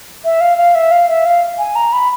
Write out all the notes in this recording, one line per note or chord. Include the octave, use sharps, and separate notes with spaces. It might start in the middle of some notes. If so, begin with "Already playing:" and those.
E5
F5
F5
E5
F5
E5
F5
G#5
A#5
B5